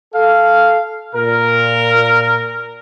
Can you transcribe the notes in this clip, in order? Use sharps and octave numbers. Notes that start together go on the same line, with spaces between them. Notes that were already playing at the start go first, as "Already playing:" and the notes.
A4 F5
A#2 A#4